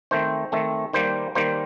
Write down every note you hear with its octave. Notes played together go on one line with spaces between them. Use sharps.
D#3 A3 C4 C5
D#3 A3 C4
D#3 G3 A#3 C5
D#3 G3 A#3 C5